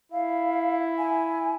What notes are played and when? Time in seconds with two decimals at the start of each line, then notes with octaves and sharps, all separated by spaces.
0.12 E4 F5
0.98 G#5